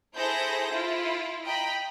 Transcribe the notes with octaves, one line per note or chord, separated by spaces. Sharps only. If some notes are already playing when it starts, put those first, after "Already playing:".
E4 G#4 A4 C5 G6 A#6
E4 F4
D#5 G5 A#5 B5